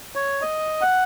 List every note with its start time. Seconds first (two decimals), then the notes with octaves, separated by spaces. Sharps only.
0.16 C#5
0.41 D#5
0.81 F#5